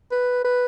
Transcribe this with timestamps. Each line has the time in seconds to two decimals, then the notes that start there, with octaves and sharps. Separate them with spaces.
0.11 B4
0.44 B4